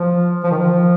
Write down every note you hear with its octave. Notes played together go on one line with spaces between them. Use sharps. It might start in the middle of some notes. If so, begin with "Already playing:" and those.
Already playing: F3
F3
D#3
F3